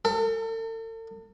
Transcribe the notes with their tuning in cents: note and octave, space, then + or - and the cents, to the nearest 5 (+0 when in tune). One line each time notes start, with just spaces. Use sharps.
A4 +40